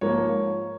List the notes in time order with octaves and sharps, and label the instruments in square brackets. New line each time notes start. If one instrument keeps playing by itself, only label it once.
[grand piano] G#2 F3 A#3 C#5